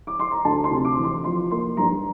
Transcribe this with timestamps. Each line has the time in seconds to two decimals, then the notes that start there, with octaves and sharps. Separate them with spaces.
0.07 D6
0.20 C6
0.31 A#5
0.45 D2 A5
0.64 C6
0.71 C3
0.85 D6
0.98 E3
1.04 C6
1.24 F3 C6
1.51 A#3 C6
1.77 G2 A#5